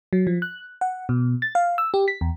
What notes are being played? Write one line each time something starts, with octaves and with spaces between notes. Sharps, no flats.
F#3
F3
F#6
F#5
B2
A6
F5
E6
G4
B6
E2